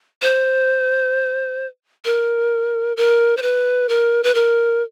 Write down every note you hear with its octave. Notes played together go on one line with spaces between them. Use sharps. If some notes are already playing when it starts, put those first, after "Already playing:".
C5
A#4
A#4
C5
B4
A#4
B4
A#4